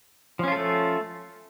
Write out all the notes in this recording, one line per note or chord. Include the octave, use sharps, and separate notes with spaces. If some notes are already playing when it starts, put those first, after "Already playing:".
F3 A3 C#4 F4 A4